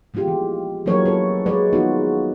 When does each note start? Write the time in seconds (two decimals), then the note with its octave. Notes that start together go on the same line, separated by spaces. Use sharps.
0.14 A#2 G#3 B3 F4 G4
0.28 E3
0.86 E3 F#3 A#3 G#4 A#4 C#5
1.05 C#4 A4 B4
1.46 E3 G#3 B4 C#5 D5
1.72 D#3 B3 D#4 F4 F#4